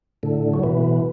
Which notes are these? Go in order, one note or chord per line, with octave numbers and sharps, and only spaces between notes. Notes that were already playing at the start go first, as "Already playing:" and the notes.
A2 D3
F#3
B2 E3